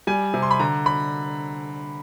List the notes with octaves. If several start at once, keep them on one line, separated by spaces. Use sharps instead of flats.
G3 G#5
C3
C6
B5
D3 A#5
B5